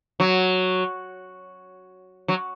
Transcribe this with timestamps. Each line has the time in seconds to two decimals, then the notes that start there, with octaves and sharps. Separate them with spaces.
0.20 F#3
2.28 F#3